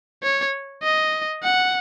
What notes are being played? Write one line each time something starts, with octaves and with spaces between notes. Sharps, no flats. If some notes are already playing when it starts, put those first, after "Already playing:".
C#5
D#5
F#5